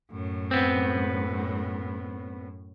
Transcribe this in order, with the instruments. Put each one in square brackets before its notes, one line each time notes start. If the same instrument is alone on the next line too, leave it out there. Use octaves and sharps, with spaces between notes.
[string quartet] F#2 A2
[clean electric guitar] B3 C4